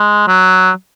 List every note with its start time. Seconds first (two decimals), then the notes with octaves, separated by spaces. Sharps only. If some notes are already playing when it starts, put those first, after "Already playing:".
Already playing: G#3
0.28 F#3